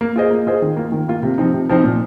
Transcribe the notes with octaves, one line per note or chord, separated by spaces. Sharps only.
A#3
F4 G#4 C5 D#5
A#3
F4 G#4 C5 D#5
D#3
A#3 F4
D#3
A#3 F4
C3
F3 C4 D#4
C3
F3 C4 D#4
A#2